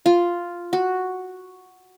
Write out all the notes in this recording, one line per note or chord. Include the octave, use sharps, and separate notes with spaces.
F4
F#4